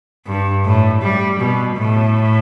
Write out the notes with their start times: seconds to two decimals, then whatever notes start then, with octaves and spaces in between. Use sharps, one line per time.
0.27 G2
0.65 A2
1.02 G3
1.40 B2
1.77 A2